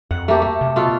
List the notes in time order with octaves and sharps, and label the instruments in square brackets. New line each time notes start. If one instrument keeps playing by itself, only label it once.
[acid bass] F2 [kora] F#5
[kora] A3 A#3 G4
A3
[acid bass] C3
[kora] B2 F4 A4